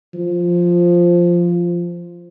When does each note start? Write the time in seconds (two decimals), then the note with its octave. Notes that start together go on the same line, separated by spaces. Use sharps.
0.14 F3